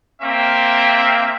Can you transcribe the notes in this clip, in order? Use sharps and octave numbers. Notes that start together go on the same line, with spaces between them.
A#3 C4 E5